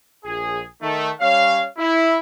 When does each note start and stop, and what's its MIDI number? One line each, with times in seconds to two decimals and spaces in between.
0.24 0.63 34
0.24 0.63 68
0.81 1.10 51
0.81 1.10 57
1.20 1.65 55
1.20 1.65 61
1.20 1.65 73
1.20 1.65 77
1.78 2.17 64